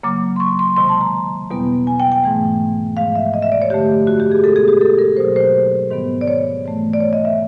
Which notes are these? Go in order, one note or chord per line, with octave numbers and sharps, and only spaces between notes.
C#3 F#3 A#3 D6
C6
C#6
C6
C3 D#3 G#3 C6
A5
A#5
E2 B2 G3 B3
G#5
G5
G5
G#2 E3 A3
G#2 F3 G#3 F5
E5
D#5
E5
D5
C#5
F#2 D3 F3 A3 G4
F#4
G4
G#4
B2 G#3 B3 A4
G#4
G4
A4
A#4
B2 F#3 A#3 C5
C5
G#2 D#3 G3 B3
D5
C#5
G#2 E3 A3
D5
C#5
D#5
E5